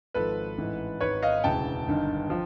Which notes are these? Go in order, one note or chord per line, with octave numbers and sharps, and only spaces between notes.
G#1 G#2 F3 A4 B4
A1 G#2 E3
G#1 G#2 D#3 B4 C#5
D#5 F5
E1 D2 C#3 E3 G5 A5
G1 G2 D#3
F3